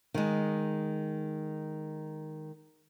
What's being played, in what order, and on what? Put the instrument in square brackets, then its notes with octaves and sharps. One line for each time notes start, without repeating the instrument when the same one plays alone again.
[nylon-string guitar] D#3 G#3